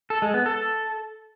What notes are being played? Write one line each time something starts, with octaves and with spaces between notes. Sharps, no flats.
A4
G#3
B3
A4